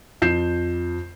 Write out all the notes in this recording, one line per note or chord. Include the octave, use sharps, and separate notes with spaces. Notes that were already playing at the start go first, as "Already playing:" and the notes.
F2 G6 C7 E7